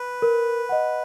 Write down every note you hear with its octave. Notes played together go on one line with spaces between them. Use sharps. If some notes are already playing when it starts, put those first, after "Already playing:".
Already playing: B4
A#4
D#5 F#5